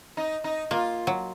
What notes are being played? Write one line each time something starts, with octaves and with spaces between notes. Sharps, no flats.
D#4
D#4
A#3 F4
F#3